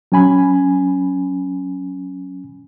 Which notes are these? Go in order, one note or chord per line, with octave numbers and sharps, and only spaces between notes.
F#3 C#4 G#5 B5